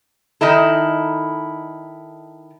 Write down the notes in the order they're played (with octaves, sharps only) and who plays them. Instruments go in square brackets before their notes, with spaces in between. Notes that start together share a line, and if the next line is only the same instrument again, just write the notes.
[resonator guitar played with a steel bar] D#3 D#4 E4 A4